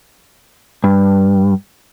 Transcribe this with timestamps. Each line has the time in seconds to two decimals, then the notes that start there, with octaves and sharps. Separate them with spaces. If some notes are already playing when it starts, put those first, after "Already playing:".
0.84 G2